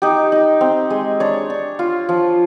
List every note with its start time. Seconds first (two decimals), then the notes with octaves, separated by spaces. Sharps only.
0.02 D#4 G4
0.32 D#4
0.61 C4
0.90 G#3
1.20 D4 C#5
1.50 D4
1.79 F4
2.09 F3